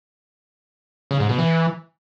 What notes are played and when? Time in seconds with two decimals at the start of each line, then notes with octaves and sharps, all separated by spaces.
1.11 C#3
1.20 G#2
1.29 B2
1.38 E3